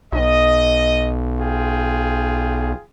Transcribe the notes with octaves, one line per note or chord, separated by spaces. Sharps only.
B1 D#5
F4 G#4 G5